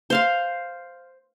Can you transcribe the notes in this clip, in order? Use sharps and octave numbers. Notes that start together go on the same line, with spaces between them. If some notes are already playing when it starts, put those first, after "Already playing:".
C5 F5 C6